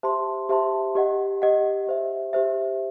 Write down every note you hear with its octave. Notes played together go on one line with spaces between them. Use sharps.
G4 C5 E5 A5 C6
G4 C5 E5 A5 C6
G4 D#5 F#5
G4 D#5 F#5
G4 C5 E5
G4 C5 E5